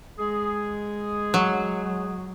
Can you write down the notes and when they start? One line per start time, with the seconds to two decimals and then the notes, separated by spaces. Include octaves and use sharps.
0.18 G#3 G#4
1.34 F#3